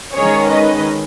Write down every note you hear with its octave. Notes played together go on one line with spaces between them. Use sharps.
D#3 G#3 C#4 G#4 C#5
B4 D#5